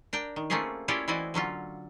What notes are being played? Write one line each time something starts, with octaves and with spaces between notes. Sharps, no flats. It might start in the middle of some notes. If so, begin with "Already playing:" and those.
D4 A#4 G5
D#3
A3 A#3 C4 C#4 F4 G#4
C#4 E4 F4 G4 C#5 D5
E3 C4 E4 F#4 D5 D#5
D3 F#3 C#4 F4